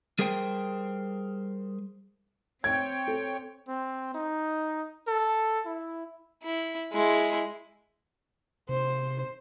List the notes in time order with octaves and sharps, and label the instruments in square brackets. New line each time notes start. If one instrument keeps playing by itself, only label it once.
[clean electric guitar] G3 G#4 A#4 C5 G5
[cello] C4 [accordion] C#5 G5 [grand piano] G#6
[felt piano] A4
[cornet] C4
D#4
A4
E4
[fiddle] E4
G#3 E4
[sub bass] C3 [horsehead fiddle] C5